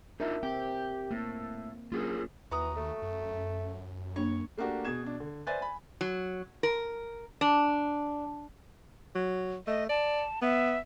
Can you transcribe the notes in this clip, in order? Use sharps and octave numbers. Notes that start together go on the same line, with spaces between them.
D4 D#4 F4 A#4 E5
C4 G4 G5
A2 A#3
F#3 A#3 C#4 F4 G#4 A#4
D#2 E3 F#4 A#5 D#6
A3
F#2
A#3 D4 C#5
A3 A#3 D4 F#4 G4
B2 G#4 G#6 E7
B2 D4
D3
B4 C5 D5 E5 G#5 A6
G#5 B5
F#3
A#4
D4
F#3
A3 D#5
D5 A5
B3 E5